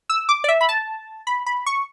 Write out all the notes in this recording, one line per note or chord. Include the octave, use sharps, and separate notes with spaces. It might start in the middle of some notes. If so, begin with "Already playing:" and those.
E6
D6
D5
E5
B5
A5
B5
B5
C#6